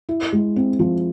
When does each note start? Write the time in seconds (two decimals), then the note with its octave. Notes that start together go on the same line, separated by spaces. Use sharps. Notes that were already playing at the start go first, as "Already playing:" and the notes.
0.09 E4
0.33 G#3
0.56 C4
0.79 F3